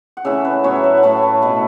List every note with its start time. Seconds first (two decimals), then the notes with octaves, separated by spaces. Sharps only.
0.17 F#5
0.25 C#3 E3 A3 E5
0.45 B4
0.64 A2 F#3 B3 E4 C#5
0.76 F#5
0.84 E5
0.97 F#5
1.03 A2 A3 E4 A5
1.23 A5
1.42 B2 A3 E4 F#5